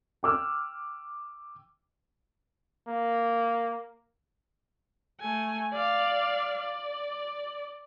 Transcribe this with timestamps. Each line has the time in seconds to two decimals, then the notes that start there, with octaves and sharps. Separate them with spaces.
0.23 G5 D6 E6 F6
2.88 A#3
5.20 A3 G#5
5.73 D5 F5
6.59 D5